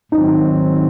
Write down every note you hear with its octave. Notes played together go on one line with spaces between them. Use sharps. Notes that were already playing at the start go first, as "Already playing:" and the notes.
G#2 D#3 F#3 C4 D#4